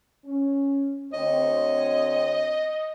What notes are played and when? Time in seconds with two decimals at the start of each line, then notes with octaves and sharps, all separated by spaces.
0.26 C#4
1.13 D2 C4 C#5 D#5